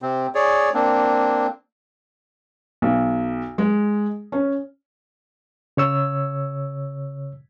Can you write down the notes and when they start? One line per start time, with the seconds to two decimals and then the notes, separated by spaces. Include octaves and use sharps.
0.02 C3 C4
0.35 G#4 C#5 D5
0.74 A#3 C4 D4
2.82 B1
3.58 G#3
4.32 C#4
5.77 C#3 C#5 E6